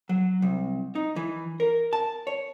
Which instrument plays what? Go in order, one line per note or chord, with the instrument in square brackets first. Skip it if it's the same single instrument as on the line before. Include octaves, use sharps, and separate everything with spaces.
[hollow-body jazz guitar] F#3
C2
D#4
E3
A#4
A5
C#5